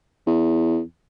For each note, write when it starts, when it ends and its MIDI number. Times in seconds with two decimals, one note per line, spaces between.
0.27 0.80 40